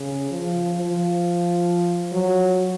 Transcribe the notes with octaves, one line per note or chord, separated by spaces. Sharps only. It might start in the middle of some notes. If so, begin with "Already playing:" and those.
Already playing: C#3
F3
F3
F#3